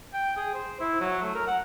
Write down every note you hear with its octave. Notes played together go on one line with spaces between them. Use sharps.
G5
G#4
C5
E4
F#3
A3
A#4
F#5